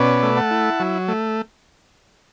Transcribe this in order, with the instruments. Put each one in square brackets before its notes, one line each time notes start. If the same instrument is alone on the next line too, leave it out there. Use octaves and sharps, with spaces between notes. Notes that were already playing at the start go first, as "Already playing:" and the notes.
Already playing: [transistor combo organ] B2 C#4 B4 D5
A3
F#5 A5
E4
F#3
A3